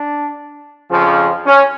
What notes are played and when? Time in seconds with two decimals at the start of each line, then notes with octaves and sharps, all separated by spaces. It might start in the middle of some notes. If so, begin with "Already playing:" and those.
Already playing: D4
0.91 F2 C#3 F3
1.46 C#4